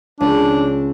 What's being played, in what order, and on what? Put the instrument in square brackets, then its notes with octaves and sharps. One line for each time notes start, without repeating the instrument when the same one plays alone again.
[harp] C#2 [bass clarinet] D4